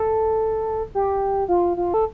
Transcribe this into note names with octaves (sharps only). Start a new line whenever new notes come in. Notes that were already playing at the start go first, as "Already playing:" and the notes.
Already playing: A4
G4
F4
F4
A4